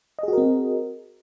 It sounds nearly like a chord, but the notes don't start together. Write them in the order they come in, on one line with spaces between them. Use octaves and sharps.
D#5 G#4 F#4 A#4 C4